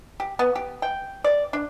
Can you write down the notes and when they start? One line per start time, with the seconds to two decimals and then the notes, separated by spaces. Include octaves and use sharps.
0.20 G4
0.39 B3
0.55 G4
0.82 G5
1.24 D5
1.53 D4